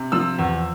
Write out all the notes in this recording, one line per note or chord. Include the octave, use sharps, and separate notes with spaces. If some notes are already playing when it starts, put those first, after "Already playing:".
Already playing: C3
F3 E6
E2